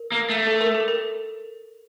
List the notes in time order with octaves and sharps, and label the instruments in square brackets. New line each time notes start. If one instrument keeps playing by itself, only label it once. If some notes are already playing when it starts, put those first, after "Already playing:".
Already playing: [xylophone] A#4
[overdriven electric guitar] A#3
A3
[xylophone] A4
A#4
A4
A#4